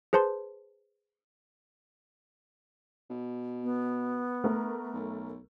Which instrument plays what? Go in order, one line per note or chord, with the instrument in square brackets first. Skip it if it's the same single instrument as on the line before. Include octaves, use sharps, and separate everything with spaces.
[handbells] G#4 B4 C5 A5 C6
[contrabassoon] B2
[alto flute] B3
[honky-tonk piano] A3 A#4
[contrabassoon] B1